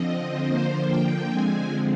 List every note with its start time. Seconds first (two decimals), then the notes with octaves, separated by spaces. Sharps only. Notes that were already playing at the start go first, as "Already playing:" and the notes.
Already playing: D3 F3 C4 D#5
0.49 D3 F3 A#3 C5
0.89 G5
1.29 D3 F3 G#3 C4 G#5